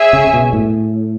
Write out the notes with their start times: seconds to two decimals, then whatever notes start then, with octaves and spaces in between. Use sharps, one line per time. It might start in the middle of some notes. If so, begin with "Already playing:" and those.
Already playing: G#4 C#5 E5 G#5
0.13 C#3
0.27 C#3
0.33 B2
0.53 A2